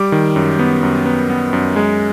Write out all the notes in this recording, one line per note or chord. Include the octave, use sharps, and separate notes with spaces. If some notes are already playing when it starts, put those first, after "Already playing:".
Already playing: G3 D6
D#3
F#2
B3
F#2
B3
B3
F#2
G#3